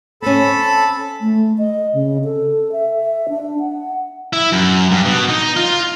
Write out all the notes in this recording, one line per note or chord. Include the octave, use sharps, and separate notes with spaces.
C4 C#4 A4 A5 B5
A3
D#5
C#3
A4
E5
D4
F#5
E4
F#2
G2
B2
D#4
F4